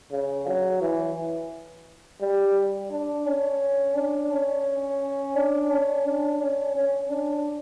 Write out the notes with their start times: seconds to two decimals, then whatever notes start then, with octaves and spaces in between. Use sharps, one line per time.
0.12 C#3
0.47 F#3
0.82 E3
2.21 G3
2.91 D4
3.26 C#4
3.96 D4
4.31 C#4
5.35 D4
5.71 C#4
6.06 D4
6.41 C#4
6.76 C#4
7.11 D4